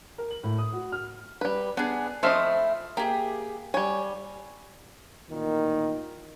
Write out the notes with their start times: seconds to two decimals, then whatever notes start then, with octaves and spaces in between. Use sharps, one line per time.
0.18 A#4
0.31 F#7
0.43 A2
0.58 D#6
0.72 F#4
0.92 F6
1.41 G3 B4
1.77 B3 D4 G#4
2.23 F3 A3 C4 E4 D#5 F5
2.97 A#3 G4 G#4
3.74 G3 C#5 G#5
5.30 A1 A#2 D#3